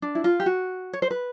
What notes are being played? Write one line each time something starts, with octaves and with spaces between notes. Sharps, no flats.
D4
E4
F4
G4
F#4
C#5
C5
B4